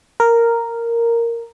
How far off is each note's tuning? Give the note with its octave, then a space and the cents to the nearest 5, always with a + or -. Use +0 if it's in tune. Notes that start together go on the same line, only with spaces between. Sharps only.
A#4 -5